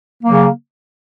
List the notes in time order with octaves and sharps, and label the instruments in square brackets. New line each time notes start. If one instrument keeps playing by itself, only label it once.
[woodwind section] C#3 F#3 A#3